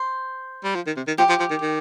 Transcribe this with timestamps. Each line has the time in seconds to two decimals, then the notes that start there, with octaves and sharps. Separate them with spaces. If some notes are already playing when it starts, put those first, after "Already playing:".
Already playing: C5
0.64 G3
0.76 F3
0.86 D#3
0.97 C3
1.07 D#3
1.18 F3 G4
1.29 F3
1.40 F3
1.50 D#3
1.62 D#3